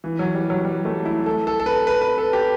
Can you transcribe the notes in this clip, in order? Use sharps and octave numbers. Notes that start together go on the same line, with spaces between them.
E3
F#3
G3
F#3
G3
A3
E4
A4
A4
A4
B4
B4
B4
A4
G4